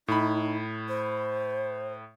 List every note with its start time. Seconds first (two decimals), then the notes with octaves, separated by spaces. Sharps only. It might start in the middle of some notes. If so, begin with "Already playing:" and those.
0.08 A2 D#4 B5
0.89 C5